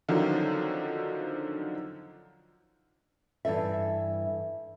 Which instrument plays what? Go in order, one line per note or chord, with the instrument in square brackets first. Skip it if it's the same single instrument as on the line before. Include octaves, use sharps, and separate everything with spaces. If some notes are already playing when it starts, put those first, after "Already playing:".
[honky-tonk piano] D3 D#3 F3 F#3 C4 C#4
[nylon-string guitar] G2 E3 A4 E5